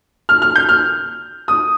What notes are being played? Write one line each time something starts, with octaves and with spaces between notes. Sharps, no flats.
F6
F6
G6
F6
D#6